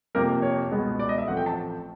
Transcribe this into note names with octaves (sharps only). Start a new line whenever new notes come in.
F2 C3 F3 A#3 A#4
C#5
C#2 B2 G#3 B3
D5
D#5
E5
A1 A2 F3 A3 C4 F#5
G5
A5